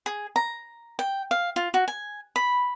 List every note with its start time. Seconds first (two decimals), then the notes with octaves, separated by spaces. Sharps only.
0.06 G#4
0.36 A#5
0.99 G5
1.31 F5
1.56 F4
1.74 F#4
1.88 G#5
2.36 B5